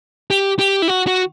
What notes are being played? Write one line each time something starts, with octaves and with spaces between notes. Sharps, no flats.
G4
G4
E4
F#4
F#4